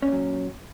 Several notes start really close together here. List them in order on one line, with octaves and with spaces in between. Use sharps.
C#4 A#2 F#3